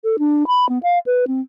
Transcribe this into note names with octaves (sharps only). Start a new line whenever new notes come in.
A4
D4
B5
B3
F5
B4
C4